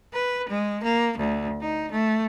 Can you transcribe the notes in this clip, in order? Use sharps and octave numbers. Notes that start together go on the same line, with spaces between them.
B4
G#3
A#3
D2
D#4
A3